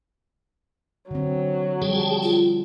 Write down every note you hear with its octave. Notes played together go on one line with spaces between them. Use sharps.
D3 F#3 C4
F3 G3 G#4 G5 A5
F4